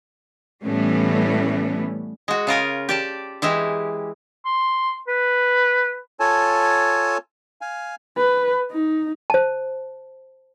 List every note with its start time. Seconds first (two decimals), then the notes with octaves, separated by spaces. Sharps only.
0.64 A2 E3 G3 A3 B3 C#4
2.28 G#3 F#4
2.47 C#3 F4 A#4 G#5
2.89 G4 D5 A5
3.42 E3 G#3 E4 G4
4.45 C6
5.08 B4
6.20 F4 A4 C#5 G#5 A5
7.61 F5 G#5
8.17 B4
8.71 D#4
9.30 C5 A5